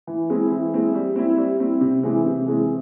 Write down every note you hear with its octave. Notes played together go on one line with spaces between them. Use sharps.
E3
G#3 C4 E4
E3
G#3 C4 E4
G3
C4 E4
G3
C4 E4
C3
E3 G#3 C4
C3
E3 G#3 C4